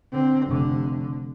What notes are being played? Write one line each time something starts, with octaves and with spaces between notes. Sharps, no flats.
D3 C4
F1 D3